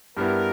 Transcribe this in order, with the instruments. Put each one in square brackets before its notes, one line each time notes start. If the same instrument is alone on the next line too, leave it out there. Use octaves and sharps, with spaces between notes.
[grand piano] G2 G3 B3 E4 [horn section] A#4